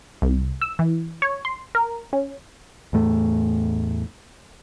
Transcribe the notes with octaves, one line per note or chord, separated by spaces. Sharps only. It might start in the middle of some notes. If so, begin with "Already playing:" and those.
C2
E6
E3
C#5
C6
A#4
C#4
E2 A2 A3